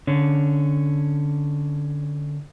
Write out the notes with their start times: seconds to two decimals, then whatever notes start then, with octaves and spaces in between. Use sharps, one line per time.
0.07 D3 C#4